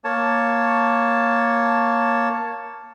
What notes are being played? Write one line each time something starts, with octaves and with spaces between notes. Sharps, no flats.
A#3 C#5 A5